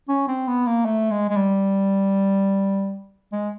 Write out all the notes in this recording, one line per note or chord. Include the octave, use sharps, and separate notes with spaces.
C#4
C4
B3
A#3
A3
G#3
G#3
G3
G#3